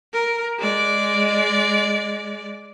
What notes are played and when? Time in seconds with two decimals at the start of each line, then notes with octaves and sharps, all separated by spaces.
0.14 A#4
0.58 G#3 D5